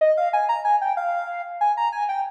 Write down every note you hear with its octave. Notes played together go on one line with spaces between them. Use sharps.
D#5
F5
G#5
A#5
G#5
G5
F5
G#5
A#5
G#5
G5